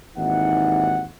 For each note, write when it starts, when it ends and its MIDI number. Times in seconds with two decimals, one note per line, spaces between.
0.16 1.04 32
0.16 1.04 39
0.16 1.04 52
0.16 1.04 63
0.16 1.04 78